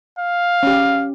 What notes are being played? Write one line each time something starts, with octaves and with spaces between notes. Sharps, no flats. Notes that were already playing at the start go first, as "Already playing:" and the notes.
F5
C#4 G4